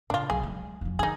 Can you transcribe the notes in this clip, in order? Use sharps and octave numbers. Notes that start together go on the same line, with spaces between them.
A2 C#3 D4 F4
B1 G#4
G3 G#3
F1 F#3
D#3 D#4 G#4